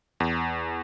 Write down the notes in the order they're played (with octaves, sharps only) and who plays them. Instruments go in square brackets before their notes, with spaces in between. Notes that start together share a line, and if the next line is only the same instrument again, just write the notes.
[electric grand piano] E2